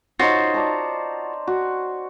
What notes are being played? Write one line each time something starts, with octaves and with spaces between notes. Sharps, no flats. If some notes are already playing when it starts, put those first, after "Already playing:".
D#4 F4 F#4 C5 C#5
D5 A5 A#5
F#4